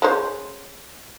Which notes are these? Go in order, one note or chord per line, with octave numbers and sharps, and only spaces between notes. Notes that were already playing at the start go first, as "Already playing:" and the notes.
G#3 C#4 C5